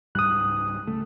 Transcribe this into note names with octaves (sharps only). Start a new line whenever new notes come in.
C#2 G#2 G3 D#6 F#6
C#2 A3